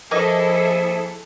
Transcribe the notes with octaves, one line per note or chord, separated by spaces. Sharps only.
F3 A#3 E4 G#4 A4 D#5